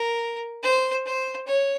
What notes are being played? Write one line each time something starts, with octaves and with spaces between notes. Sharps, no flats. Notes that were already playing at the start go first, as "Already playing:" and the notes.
Already playing: A#4
C5
C5
C#5